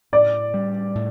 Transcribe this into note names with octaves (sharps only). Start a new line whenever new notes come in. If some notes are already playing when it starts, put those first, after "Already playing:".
A2 D5
G3
A2